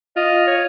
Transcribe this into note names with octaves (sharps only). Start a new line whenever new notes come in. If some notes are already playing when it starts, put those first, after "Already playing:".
F4 D#5
C#5